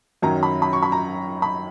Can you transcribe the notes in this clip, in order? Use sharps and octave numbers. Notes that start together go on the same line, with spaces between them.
F#2 D#3 F#3 C#4 A#5
B5
B5
C#6
B5
A#5
B5